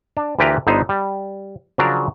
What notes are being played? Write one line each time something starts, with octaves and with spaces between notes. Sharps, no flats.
D4
D2 E3 F4 G4 A#4 B4
G1 D3 B3 D#4 C5
G3
C#3 F3 F#3 D4 A#4